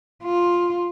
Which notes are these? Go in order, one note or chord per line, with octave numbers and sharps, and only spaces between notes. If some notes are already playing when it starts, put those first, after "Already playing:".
F4